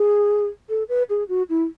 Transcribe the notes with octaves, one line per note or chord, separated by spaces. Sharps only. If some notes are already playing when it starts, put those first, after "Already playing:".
Already playing: G#4
A4
B4
G#4
F#4
E4